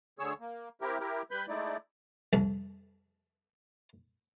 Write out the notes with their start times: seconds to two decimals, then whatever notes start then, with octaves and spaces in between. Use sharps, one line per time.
0.19 D2 D3 G#4 C#5 E6
0.40 A#3
0.81 C4 E4 G4 A#4
1.00 E4 G4 A#4
1.31 G3 B4 B5 G6
1.48 G#3 A3 D#4 E4 D5
2.33 C2 F2